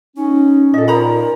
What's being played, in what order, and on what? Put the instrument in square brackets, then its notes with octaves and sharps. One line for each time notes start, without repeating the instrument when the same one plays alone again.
[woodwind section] C#4 [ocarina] D#4
[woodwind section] A#2 [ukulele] A4 D#5
[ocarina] A#4 [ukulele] C5 A#5 B5